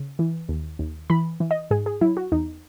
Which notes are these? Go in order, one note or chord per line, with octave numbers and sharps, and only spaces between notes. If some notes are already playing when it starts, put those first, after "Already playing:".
Already playing: C#3
E3
D#2
D#2
E3 B5
E3
D#5
G#2 G#4
G#4
F#3 E4
F#4
E2 D#4